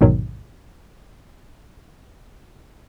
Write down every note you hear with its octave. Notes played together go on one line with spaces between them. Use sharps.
A1 E2 G#2 B2 D#3 F#3